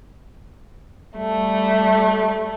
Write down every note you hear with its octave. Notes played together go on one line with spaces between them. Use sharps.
G3 A3